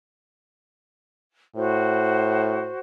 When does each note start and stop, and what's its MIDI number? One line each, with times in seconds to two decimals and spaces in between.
1.56 2.70 45
1.56 2.79 66
1.56 2.79 72